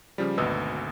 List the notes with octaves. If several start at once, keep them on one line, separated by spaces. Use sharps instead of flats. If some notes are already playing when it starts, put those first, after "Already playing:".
C#3 F3 G3
G#1 D2 B2 B3 D#5 E6